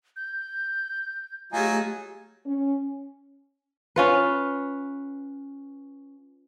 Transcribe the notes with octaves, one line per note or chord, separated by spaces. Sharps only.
G6
F#3 A3 D#4 F4 G4 G#4 G#5
C#4
C#4 F4 B4